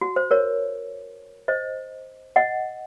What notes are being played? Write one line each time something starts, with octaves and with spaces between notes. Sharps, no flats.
F#4
C5
A#4 C#5
C5 D#5
D#5 F#5